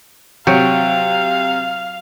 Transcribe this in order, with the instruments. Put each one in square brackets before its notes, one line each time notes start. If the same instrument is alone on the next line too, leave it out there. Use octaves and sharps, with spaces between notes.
[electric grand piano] C3 [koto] F#3 [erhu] F5 [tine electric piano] G5